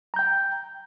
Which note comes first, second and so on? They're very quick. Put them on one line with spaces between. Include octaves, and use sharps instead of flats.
A#5 G6 G5